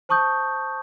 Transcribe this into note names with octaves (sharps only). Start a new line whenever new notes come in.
C5 A5 C#6 D#6 G6